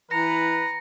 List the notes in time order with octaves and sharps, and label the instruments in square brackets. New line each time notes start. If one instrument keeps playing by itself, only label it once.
[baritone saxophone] E3 [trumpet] B4 [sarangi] A#5 [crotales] A#6 C#7